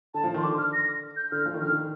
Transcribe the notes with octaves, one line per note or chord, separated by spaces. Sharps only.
D3 A5
F3
D#3
C6
D3 D6
F6
A#6
G6
D3 F6
F3
D#3
D3 F6
D#3